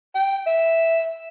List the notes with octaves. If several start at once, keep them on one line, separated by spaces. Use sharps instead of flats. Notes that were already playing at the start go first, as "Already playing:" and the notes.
G5
E5